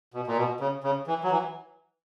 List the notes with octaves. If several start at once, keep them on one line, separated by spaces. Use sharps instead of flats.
B2
A#2
B2
C#3
C#3
E3
F#3
E3